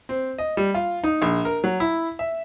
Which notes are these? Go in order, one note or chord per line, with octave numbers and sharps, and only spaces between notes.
C4
D#5
G3
F4
D#4
A#1
A#4
F#3
E4
E5